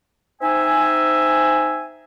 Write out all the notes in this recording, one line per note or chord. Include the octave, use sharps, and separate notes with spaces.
C4 D#4 C5 E5 G#5